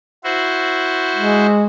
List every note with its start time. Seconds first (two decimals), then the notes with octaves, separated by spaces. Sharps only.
0.24 E4 F#4 C5
1.16 G#3